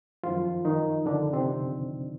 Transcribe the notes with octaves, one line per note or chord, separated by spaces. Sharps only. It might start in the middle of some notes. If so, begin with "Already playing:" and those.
F#2 D#3 F3 F4
D#3 D#4
D3 D4
C3 C4